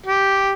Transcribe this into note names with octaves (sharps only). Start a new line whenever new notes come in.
G4